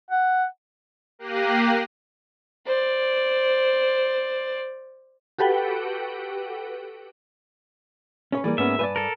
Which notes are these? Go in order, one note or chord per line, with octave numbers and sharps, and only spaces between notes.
F#5
A#3 G4 F#6 A#6 C7 D#7
C5 D5
F#4 G4 A4 B4 F#5 G5
C#4 B4 C#5 D5
E3 G3 A#3 G#4 D5
G#2 B3 C#4 E5
G2 B4 C5 D5 G#5 A5
A4 A#4